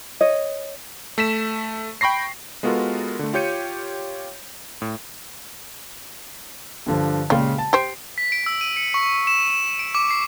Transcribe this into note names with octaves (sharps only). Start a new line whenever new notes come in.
C#5 D#5
A3 B6 E7
G5 B5 C#6 A#6 C7
G#3 B3 F4 F#4 A4 A#4
D3 A3
F4 G4 C#5 G6 C#7 D#7
A2
G2 D3 F3
A#2 C#3 G3 G#3 F4
A5
G4 C5 C7 D7
B6
D7
E6
D#7
C#7
C#6
E7
E7
D7
D6
C7